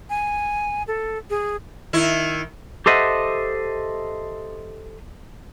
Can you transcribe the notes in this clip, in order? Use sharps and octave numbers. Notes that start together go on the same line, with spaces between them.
G#5
A4
G#4
D#3 E4
G4 A4 C5 D#5 E5 F#5